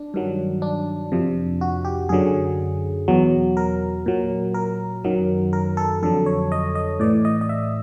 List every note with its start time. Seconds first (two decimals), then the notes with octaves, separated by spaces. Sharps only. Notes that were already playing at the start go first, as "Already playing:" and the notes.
Already playing: D4
0.14 G2 D#3 F#3
0.62 D4
1.12 F2 C3 F3
1.61 F#4
1.85 G4
2.09 F#2 D3 F#3 G#4
3.08 E2 B2 F#3
3.57 A#4
4.06 A#2 F#3
4.54 A#4
5.04 F#2 D#3 F#3
5.53 A#4
5.77 A4
6.03 F2 D3 F#3 A4
6.26 C#5
6.52 D#5
6.75 D#5
7.00 A2 E3 D5
7.25 D#5
7.41 D#5
7.49 E5